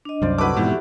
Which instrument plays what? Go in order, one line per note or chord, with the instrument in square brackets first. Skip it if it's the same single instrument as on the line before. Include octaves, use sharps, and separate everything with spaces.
[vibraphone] D4 D#5
[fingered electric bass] C2 F#2 [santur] C5 D5 F5
[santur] A3 E4 F#4 [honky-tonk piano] B4 D6
[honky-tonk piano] F2 E3 [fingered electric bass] G#2 B2 [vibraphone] G4 E5 [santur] D5